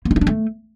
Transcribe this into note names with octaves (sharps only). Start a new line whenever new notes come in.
A#3
D4
D#4
D4
A3